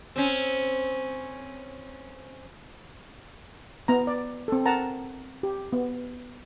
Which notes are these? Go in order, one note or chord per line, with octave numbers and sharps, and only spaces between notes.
C4 C#4
B3 A#5
D5
C4 A4
A#4 F#5 A5 A#5
G4
B3